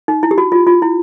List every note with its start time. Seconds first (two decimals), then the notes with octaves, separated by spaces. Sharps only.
0.08 D#4
0.23 E4
0.31 G4
0.38 F#4
0.52 F4
0.67 F4
0.82 E4